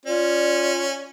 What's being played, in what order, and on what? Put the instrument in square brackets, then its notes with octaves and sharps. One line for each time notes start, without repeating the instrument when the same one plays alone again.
[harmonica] C#4 [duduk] F4 [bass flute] D5